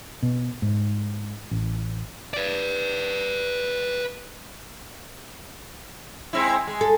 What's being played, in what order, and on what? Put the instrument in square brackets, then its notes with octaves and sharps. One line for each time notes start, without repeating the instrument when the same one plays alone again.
[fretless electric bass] B2
G#2
A1
[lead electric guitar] B4 D5
[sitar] G#3 C4 E4
G#3
[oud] A4